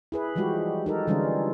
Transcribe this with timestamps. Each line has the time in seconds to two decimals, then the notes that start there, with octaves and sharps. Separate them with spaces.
0.12 E4 G#4 B4
0.35 E3 F3 G3 G#3 F#4 G4
0.86 D#4 A4 A#4
1.07 D3 E3 G3 G#3 C#4 F4